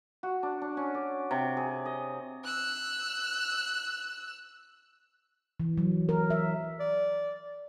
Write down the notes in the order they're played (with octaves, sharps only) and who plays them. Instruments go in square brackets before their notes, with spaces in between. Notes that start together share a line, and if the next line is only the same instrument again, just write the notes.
[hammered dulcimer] F#4
D4
D4
C#4
D5
C3
G#4
D#5
[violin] E6 F#6
[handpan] E3
F#3
A#4
E5
[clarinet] D5